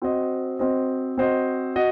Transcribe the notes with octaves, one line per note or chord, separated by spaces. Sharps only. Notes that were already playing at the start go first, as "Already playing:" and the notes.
C4 F#4 C5 D#5
C4 F#4 C5 D#5
C4 F#4 C5 D#5
F#4 D#5